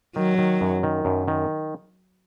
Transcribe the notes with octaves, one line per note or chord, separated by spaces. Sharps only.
D#3 F#3
D#3
F#2
D#3
F#2
D#3